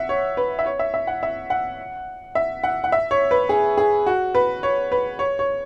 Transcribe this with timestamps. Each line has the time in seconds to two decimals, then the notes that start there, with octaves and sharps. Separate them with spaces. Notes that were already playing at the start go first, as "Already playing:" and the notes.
Already playing: E5 F#5
0.09 C#5
0.37 B4
0.59 E5
0.66 C#5
0.79 E5
0.94 E5
1.07 F#5
1.23 E5
1.50 F#5
2.35 E5
2.64 F#5
2.84 F#5
2.92 E5
3.11 C#5
3.31 B4
3.49 G#4
3.78 G#4
4.06 F#4
4.35 B4
4.63 C#5
4.92 B4
5.19 C#5
5.39 C#5